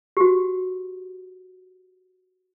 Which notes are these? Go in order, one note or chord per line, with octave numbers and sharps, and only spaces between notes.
F#4 G4